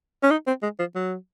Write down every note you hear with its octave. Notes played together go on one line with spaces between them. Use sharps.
C#4
D#4
C4
G#3
F3
F#3